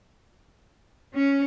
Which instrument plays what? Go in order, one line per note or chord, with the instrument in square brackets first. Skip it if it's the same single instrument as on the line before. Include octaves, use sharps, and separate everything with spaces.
[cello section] C#4